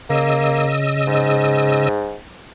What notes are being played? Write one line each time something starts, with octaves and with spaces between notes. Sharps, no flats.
C#3 A#3 D#5 E6
G#2